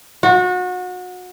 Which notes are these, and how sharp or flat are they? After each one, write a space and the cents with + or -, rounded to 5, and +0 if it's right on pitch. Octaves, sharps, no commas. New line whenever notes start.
F#4 -30